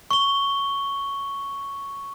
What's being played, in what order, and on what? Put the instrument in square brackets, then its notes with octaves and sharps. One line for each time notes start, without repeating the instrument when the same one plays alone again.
[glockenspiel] C#6 G7